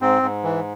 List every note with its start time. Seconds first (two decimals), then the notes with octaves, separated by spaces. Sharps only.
0.01 G#2 C4
0.22 G#2
0.44 E3